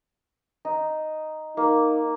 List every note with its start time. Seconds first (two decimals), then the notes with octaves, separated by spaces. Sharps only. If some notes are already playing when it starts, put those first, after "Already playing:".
0.65 D#4
1.57 A#3 D#4